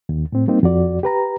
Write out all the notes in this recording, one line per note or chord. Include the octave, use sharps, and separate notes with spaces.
D#2
A2 C4
G3 A#3 C4 D#4
F2 F#4 D5
G4 B4 A#5